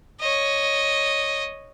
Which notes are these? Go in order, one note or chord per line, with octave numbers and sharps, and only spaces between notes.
C#5 D#5